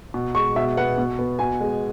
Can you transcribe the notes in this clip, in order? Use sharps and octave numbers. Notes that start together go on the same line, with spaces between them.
B2
G#3 C#6
B2 E5
B3 F#5
B2
B3
B2 G#5
G#3